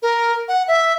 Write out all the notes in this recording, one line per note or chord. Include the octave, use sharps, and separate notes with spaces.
A#4
F#5
E5